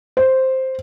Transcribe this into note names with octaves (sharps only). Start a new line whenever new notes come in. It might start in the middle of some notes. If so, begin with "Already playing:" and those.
C5